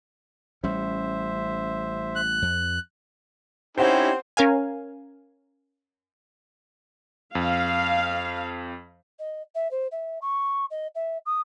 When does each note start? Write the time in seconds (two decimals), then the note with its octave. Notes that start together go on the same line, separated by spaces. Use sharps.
0.64 A1 G3 C#4 C5 E5
2.16 F#6
2.42 F2
3.78 C4 C#4 D#4 E4 G4 C5 F#5
4.37 C#4 A#4 F5 G#5
7.35 F2 F5
9.19 D#5
9.54 E5
9.71 C5
9.91 E5
10.21 C#6
10.70 D#5
10.95 E5
11.25 D#6